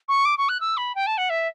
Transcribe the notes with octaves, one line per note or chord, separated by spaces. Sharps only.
C#6
D6
C#6
F#6
E6
B5
G5
A5
F#5
E5